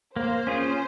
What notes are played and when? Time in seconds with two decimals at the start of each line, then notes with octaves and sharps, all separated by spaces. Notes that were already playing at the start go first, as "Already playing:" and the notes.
0.16 A#3 C5
0.47 C#4 F4 G#4